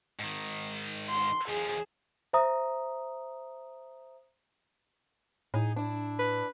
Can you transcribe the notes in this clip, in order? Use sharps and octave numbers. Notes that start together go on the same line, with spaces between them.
G#2 D#3
C6
D#2 F3 G#4
C5 E5 A#5 D#6
A2 D#4 G#4
D4 E4
B4